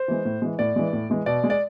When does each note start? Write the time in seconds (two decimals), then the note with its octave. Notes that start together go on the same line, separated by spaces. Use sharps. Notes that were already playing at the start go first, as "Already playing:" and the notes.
Already playing: C5
0.08 E3 G#3
0.25 A2
0.42 E3 G#3
0.59 A2 D5
0.76 E3 G#3
0.93 A2
1.10 E3 G#3
1.26 B2 D5
1.44 G#3
1.50 D5